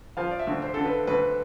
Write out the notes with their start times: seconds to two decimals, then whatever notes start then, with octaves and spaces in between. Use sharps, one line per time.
0.17 F3 F5
0.31 D5
0.39 E5
0.47 D2
0.62 C5
0.74 D3 A4
0.85 B4
1.07 D2 B4